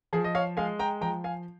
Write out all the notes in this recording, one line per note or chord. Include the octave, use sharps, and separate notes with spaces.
F3 G#4
D#5
C#5 F5
G#3 F5 G#5
G5 A#5
F3 G5 A#5
F5 G#5